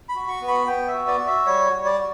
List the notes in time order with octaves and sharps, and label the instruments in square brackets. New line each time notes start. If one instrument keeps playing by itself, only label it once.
[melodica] B5
F#4
C#6
B3
B5
B3 G5
E5
F#4
D5
F#4
E5
G3 C#5
G3
D5
F#4